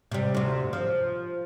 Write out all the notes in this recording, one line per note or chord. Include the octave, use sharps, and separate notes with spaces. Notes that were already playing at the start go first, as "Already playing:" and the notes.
C3 G3
D2 C3
F3